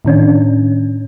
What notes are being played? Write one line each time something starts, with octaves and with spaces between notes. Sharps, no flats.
A2 D#3 C#4 D4